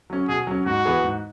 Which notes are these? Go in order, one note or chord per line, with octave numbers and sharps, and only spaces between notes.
F#3 C#4
B2 G#4
F#3 C#4
G#2 F#4
E3 B3 G#4 B4
G#2